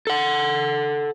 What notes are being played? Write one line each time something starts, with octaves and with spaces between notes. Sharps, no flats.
A4 F#5